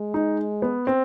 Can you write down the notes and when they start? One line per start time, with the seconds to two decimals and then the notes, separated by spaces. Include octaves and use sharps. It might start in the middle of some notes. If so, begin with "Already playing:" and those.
Already playing: G#3
0.14 D#4
0.62 B3
0.87 C4